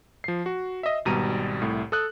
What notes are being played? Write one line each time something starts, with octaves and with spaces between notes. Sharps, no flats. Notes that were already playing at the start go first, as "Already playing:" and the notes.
F3 C7
F#4
D#5 E5
G#1 B2 G3 A#5 D#7
C2 A2
A4 D#6 F#6